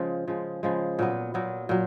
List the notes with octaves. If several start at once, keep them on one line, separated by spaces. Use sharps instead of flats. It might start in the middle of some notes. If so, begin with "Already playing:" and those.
Already playing: C#3 F3 G#3
C#3 F3 G#3
C#3 F3 G#3
A#2 F#3 B3
A#2 F#3 B3
A#2 F#3